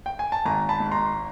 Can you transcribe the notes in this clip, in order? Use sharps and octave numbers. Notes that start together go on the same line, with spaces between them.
G5
G#5
A5
G#1 G#5 A#5
A5 B5
G#2
A#5 C6